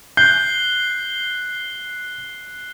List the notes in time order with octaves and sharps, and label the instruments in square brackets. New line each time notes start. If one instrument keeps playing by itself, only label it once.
[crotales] F#6 C7 G7 [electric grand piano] G6